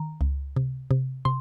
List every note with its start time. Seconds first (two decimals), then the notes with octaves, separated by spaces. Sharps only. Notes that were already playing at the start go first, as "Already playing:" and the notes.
Already playing: D#3 A#5
0.21 C#2
0.56 C3
0.91 C3
1.25 C3 C6